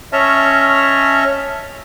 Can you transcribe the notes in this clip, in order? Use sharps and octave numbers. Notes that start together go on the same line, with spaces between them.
C#4 C#5 D#5 E5 A5 F6